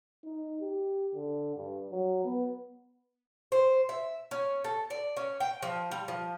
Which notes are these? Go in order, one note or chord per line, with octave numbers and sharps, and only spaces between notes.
D#4
G4
D3
G2
F#3
B3
C5
E5
C#4
A4
D5
C#4
G5
F3
G3
F3